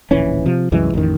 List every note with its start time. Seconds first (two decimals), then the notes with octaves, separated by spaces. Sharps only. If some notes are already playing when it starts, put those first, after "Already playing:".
0.11 D1 A#1 E3 C#4
0.46 C3 F3
0.72 C2 F#2 E3 G#3
0.94 A1 F2 D#3